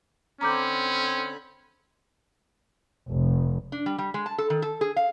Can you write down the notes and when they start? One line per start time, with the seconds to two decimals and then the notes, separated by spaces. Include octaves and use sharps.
0.41 D3 C4 C#4 A#5 B5 D6 G6
3.10 F1
3.72 D4
3.86 G3
3.98 G3
4.14 G#3
4.26 A5
4.38 A4
4.50 D#3
4.62 A4
4.81 G#4
4.96 F5